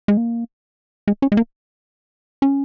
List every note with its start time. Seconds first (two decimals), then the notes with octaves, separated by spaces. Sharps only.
0.08 G#3
0.17 A#3
1.08 G#3
1.22 C#4
1.32 G#3
1.37 A#3
2.42 C#4